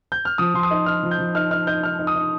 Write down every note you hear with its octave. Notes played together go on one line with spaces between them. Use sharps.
G6
F6
F3 D#6
F3 C6
D#6
D#4
D#4 F6
F3
G6
F3
D#4 F6
D#4 F6
D#4 G6
D#4 F6
D#4
D#6
D#4